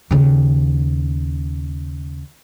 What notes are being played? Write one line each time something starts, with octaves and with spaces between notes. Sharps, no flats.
D#2 C#3